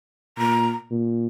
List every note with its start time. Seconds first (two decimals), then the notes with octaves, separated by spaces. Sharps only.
0.38 A#2 A#5
0.91 A#2